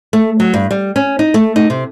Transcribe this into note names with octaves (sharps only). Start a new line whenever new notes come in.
A3
F#3
G2
G3
C#4
D#4
A3
D#4
C3